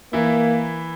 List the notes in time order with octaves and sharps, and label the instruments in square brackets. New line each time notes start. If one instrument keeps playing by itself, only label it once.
[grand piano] E3 E4 [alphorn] A#3